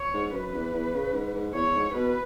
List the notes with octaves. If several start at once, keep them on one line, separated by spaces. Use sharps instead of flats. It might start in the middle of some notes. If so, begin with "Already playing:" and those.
Already playing: C#5
G#2
F#2 B4
E2
E2
C#3
G#2
G#2
E2 C#5
G#2
G#2
B2 B4